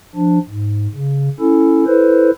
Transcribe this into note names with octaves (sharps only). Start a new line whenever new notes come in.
F3 D4
G#2
C#3
C#4 E4 A4
E4 A4 B4 C5